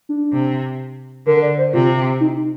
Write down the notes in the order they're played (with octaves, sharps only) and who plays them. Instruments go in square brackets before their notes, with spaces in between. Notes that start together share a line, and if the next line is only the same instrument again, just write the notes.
[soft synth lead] D4
[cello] C3
[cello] D3 [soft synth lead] A#4
[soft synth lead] D5
C5
[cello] C3 [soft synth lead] F4
[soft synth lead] D#4